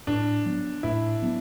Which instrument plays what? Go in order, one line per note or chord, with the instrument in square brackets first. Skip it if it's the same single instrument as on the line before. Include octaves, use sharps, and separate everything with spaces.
[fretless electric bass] A2 [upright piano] D4
[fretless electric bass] F#3 B3 D4
[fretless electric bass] A2 [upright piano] E4
[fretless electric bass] F#3 B3 D4